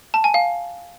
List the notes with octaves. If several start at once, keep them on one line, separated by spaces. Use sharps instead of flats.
A5
G#5
F5